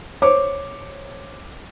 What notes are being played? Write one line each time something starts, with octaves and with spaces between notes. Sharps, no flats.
C5 C#5 D6